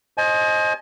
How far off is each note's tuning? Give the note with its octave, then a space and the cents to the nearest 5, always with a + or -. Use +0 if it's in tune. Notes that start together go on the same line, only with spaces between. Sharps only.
C5 +25 D#5 +0 G#5 +40